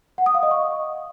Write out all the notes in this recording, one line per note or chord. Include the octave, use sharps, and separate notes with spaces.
F#5
D#6
F5
D#5
C#6